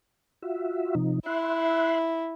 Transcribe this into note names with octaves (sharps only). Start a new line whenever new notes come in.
F4 F#4 E5
C3 F3 D#4
E4 E5 C6 F#6